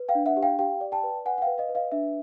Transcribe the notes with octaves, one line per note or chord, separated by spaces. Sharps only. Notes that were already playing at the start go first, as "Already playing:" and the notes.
Already playing: B4
F5 G5
D4
E5 F#5
G4
F5 G5
G4 F5 G5
D5
G5 A5
B4
B4 F#5 G#5
F#5
B4 F5 G5
D#5 F5
B4
D#5 F5
D4 E5